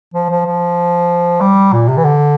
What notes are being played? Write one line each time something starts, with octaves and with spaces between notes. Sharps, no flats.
F3
F3
F3
G3
A#2
C3
E3
D3